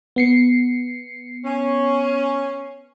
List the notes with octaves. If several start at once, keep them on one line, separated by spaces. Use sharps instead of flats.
B3 C7 C#7
C#4